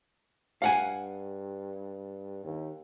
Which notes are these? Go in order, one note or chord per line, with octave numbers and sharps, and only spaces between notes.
G2 F5 F#5 G#5
D#2